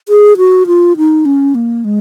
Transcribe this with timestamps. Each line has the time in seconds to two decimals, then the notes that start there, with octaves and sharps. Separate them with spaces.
0.09 G#4
0.37 F#4
0.67 F4
0.97 D#4
1.25 C#4
1.55 A#3
1.84 G#3